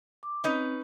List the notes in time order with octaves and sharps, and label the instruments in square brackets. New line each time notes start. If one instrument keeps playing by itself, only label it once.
[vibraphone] D6
[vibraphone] C4 [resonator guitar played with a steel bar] C#4 D#4 B4